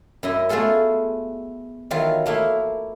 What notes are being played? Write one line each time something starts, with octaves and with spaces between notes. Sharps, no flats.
F#2 E4 D#5
A3 B3 F4 G#4 A4
D#3 E3 F#3 F4 F5
A3 A#3 E4 F5